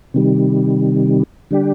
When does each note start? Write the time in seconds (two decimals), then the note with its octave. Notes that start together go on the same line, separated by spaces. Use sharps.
0.14 C3 D#3 G3
1.51 D3 G3 D4 G4